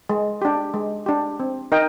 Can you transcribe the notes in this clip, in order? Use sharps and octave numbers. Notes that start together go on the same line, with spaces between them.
G#3
D4 G4
G#3
D4 G4
C4
D#4 A#4 D#5 G5